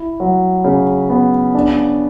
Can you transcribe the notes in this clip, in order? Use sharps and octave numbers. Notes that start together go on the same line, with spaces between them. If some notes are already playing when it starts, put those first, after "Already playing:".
Already playing: E4
F#3
C#3
B3
D4